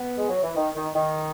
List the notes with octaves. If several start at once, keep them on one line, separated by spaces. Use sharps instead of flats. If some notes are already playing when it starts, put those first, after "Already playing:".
Already playing: B3
G#3
F#3
E3
D#3
D#3
D#3